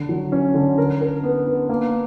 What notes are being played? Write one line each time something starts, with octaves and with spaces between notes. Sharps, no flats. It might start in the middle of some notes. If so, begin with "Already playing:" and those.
Already playing: D3
F#3
C#4
D3
A#4
A#4
B3
B3
A#3